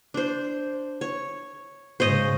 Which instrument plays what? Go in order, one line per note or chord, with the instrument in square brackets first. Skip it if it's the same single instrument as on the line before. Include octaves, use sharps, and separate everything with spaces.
[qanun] D4 C5
C#5
[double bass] G#2 C#3 [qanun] C5 C#5 D#5